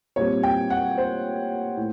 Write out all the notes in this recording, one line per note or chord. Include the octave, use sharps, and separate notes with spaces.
A#2 G3 C4 C#5
G5
F#5
C5
A2